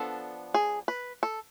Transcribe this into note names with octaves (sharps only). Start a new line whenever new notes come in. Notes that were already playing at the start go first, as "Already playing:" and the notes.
Already playing: F3 B3 D4 A4
G#4
B4
A4